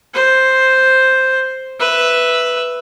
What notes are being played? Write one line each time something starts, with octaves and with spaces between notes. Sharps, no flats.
C5
B4 E5